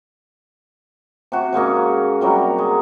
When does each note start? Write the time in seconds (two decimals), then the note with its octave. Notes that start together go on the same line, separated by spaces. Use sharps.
1.32 C3 F#4
1.53 G#2 G#3 A#3 C#4
2.21 C3 F#3 G3 A#4
2.58 G#3